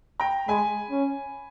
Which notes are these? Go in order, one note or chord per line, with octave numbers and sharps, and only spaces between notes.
G5 A#5
G#3 G#5 B5
C#4